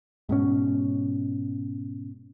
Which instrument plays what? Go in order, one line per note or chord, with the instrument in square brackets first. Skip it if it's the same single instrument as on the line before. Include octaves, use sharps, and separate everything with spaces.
[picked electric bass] G#2 B2 C#4